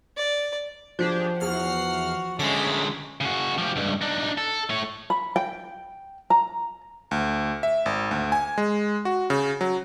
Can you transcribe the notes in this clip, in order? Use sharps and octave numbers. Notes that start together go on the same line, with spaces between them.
D5
F3 D4 G4 G#4
E2 F#4 F#5 F6 C7
D3 G#3 C#4 E5 D6
C#3 F#4
F3 G4
C#2 G2
D4 D#4
A4
A3 C#5
B5
G5
A#5
D2
E5
G#1
D2
G#5
G#3
F#4
C#3
F#3